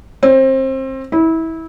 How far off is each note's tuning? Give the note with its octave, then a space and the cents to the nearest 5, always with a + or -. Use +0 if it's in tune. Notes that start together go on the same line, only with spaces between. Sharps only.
C4 +25
E4 -25